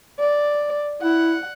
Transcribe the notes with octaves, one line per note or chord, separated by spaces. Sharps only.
D5
E4 F#5